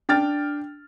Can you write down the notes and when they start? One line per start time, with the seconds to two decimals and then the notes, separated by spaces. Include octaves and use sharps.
0.09 D4 G5 F6 A6